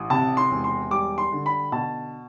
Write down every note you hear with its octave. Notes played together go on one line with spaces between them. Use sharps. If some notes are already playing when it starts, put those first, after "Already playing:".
Already playing: A1
C3 A5
C6
E1
C6
G3 D6
C6
D3
B5
B2 A5